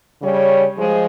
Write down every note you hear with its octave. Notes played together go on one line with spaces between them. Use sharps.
C#3 G3 C#4 C#5
F3 G#3